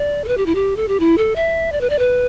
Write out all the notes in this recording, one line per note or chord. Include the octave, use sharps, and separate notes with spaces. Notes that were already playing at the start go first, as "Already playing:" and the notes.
Already playing: D5
A4
B4
G4
E4
G4
A4
G4
E4
A4
E5
D5
B4
D5
B4